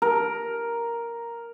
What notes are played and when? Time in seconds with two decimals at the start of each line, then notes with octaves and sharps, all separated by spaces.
0.02 A#4